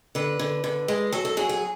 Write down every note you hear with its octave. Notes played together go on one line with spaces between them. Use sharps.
D3 B4
D3
D3
G#3
F#3 A4
A4
F#3 G#4
G#4